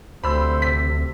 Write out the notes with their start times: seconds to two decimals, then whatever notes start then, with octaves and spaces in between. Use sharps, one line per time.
0.24 D2 C3 C5 B5 E6
0.62 B6